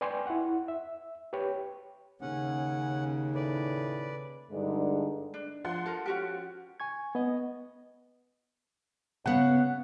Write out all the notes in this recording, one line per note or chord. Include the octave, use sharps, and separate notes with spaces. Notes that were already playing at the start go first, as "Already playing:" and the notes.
B4 D5 G5 G#5 C6 C#6
E4 F#5
E5
G4 B4 C#5 G5
D#2 C#3 C#4 F#5
A2 B4 D5
G2 D3 G#3 D#4
D4
F3 F#5 C6
A4 A#4
C#4 F#4 G4
G#5 C#6 G#6
B3 D#5
C#3 B3 F#5